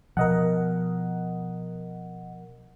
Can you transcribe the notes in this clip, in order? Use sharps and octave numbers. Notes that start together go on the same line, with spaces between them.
B2 F3 A#4 D#5 F#5